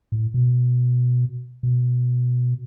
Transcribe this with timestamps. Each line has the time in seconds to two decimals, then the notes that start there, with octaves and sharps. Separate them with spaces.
0.12 A2
0.34 B2
1.63 B2